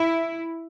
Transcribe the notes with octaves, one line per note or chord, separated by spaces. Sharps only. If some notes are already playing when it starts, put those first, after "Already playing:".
Already playing: E4